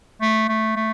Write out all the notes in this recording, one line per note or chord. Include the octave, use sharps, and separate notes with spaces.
A3
A3
A3